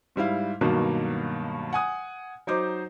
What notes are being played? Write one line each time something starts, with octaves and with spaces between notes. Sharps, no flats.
G#2 G3 E4 F5
G2 B2 D#3 F#3 A#3
F#5 G#5 D#6
F#3 D#4 C5 D6